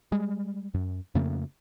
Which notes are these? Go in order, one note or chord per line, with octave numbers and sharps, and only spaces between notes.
G3 G#3
F#2
F2 C#3 A3 A#3